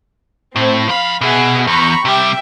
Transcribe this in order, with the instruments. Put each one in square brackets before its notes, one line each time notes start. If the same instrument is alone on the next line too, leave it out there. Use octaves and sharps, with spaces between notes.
[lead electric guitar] A2 [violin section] C4
[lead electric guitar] F3 B5 [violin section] F5
[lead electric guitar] B2 [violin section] G#4 E5 F#5
[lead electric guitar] E2 [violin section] A#5 B5 C#6
[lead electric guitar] C3 G3 [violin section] G4 E5 G5